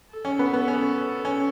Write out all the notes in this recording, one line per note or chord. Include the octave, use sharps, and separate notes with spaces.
A4
C#4
B3
B3
C#4
C#4